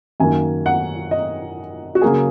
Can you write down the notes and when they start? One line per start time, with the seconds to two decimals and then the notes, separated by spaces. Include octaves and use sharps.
0.20 F#2 D#3 A#3 G#5
0.66 F#5
1.11 D#5
1.95 F#4
2.02 C#3 F#3 A#3 G#4